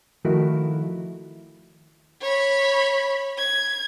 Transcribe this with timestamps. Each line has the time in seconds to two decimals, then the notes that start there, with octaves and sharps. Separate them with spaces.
0.25 D#3 F3 A3 E4 F#4 A#4
2.22 C#5 B5
3.38 G#6